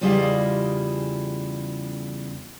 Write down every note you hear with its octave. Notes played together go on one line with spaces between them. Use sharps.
E2 C#3 G3 E4 F4 D#5